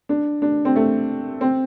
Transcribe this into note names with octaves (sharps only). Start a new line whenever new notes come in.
D4
D4
C4
A3
C4